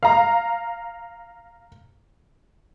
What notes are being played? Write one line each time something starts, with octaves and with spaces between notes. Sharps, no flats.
F5 A#5